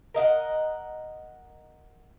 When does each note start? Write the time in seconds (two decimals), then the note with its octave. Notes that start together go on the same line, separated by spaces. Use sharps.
0.15 A#4 D#5 F5 F#5